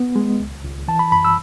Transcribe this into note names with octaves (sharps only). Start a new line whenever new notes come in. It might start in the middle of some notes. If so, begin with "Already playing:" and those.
Already playing: B3
G#3
C#2
C#2
E3 A5
B5
F#2 B5
E6